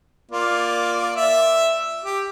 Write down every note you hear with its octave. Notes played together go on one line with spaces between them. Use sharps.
A#3 F4 D5
E5
G4